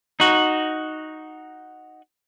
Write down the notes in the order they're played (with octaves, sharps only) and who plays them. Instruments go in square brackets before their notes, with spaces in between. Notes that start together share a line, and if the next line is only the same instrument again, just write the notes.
[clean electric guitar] D#4 F#4